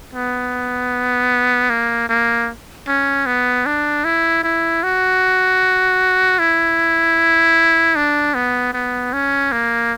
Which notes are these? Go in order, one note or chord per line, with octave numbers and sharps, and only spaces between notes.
B3
A#3
A#3
C#4
B3
D4
E4
E4
F#4
E4
D4
B3
B3
C#4
A#3